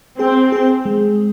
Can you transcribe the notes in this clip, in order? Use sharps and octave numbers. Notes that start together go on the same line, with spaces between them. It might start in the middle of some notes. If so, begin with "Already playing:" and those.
C4 G#4
G#4
G#3